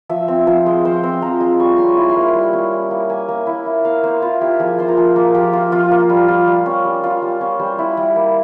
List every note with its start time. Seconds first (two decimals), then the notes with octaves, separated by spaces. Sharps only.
0.09 F3 E5
0.28 C4
0.47 F3 C5
0.66 G#3
0.85 F3 C5
1.03 C4
1.22 F3 A#5
1.40 G#3
1.60 G3 C#6
1.77 C#4 C6
1.84 C#6
1.97 E4
2.09 C6
2.16 A#3
2.35 G3
2.53 C#4
2.72 E4
2.91 A#3
3.10 A#3 G#5
3.29 A#3
3.47 E4
3.66 E4
3.85 A#3 F5
4.03 A#3 C5
4.22 E4 F4
4.41 E4 G4
4.60 F3 G#4
4.78 F4 C5
4.88 A#4
4.97 F3 G#4
5.16 A#3
5.34 F3 G4
5.53 F4
5.72 F3 F4
5.91 A#3
6.10 G3
6.28 F4
6.47 G3
6.66 C#4
6.85 G3
7.03 F4
7.22 G3
7.41 C#4
7.59 G3 C5
7.79 E4
7.97 G3
8.16 A#3